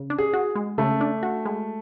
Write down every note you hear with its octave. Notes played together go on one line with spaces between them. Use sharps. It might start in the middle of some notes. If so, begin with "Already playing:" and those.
Already playing: C#3
D4
G#4
F#4
G#3
C#3 A3 A4
D4
F#4
G#3